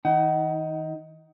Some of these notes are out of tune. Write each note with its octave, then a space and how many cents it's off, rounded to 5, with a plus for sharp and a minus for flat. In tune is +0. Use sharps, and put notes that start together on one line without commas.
D#3 +45 D#4 +15 F#5 +30